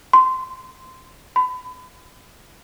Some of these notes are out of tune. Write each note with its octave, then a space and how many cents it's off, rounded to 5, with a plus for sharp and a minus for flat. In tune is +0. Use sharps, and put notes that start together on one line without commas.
C6 -15
B5 +35